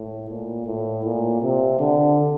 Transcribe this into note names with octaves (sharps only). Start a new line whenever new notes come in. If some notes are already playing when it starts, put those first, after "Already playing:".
Already playing: A2
A#2
A2
A#2
C3
D3